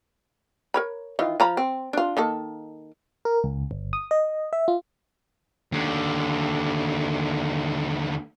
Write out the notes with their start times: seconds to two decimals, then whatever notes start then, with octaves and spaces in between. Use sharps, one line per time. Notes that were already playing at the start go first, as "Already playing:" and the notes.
0.74 A#4 C#5 B5
1.19 D#3 E3 F4
1.40 F3 A#5 B5
1.57 C4
1.93 D4 F4
2.17 D#3 A#3 A4
3.25 A#4
3.44 C#2
3.71 G1
3.93 D#6
4.11 D#5
4.53 E5
4.68 F4
5.72 D#2 D3